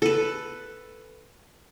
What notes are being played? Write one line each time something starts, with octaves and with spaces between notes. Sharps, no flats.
A4 B4